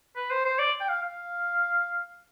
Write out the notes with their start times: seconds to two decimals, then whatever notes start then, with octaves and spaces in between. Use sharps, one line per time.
0.16 B4
0.30 C5
0.45 C5
0.59 D5
0.81 G5
0.89 F5
1.03 F5